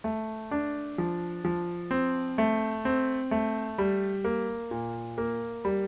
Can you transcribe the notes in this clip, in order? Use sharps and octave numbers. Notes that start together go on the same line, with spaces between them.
A3
D4
F3
F3
C4
A3
C4
A3
G3
A#3
A#2
A#3
G3